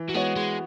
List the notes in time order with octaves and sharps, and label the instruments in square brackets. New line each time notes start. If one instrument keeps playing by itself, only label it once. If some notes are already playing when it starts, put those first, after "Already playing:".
Already playing: [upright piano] E3
[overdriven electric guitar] F#3
[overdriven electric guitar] G#3 [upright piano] B3 F#4 C#5
[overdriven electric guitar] G#3